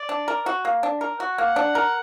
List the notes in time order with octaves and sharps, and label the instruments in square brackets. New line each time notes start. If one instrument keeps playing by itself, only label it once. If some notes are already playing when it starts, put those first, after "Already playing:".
Already playing: [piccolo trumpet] D5
[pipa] D4
A#4
F#4
A#3
D4
A#4
[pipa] F#4 [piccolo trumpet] F#5
[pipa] A#3
D4
A#4